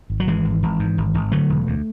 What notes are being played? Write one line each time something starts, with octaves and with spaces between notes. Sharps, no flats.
G#1
F#3
G#1 E3 G#3
G#1
G#1
G#2
G#1
G#1
D3 F#3 A3
E1
D2